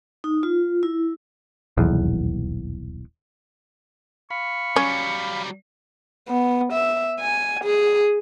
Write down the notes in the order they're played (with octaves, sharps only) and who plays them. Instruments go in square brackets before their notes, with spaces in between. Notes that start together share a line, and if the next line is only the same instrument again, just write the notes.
[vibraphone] D#4
F4
E4
[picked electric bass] D#1 B1 E2
[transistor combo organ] F5 B5 [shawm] C#6
[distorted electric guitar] F#3 G3 [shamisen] C#4
[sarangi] B3
E5
G#5
G#4